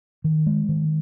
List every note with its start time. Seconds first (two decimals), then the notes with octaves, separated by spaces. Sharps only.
0.24 D#3
0.46 G#3
0.69 D#3